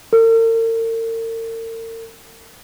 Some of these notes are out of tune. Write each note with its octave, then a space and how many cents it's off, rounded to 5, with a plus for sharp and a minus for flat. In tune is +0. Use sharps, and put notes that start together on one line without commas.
A#4 -45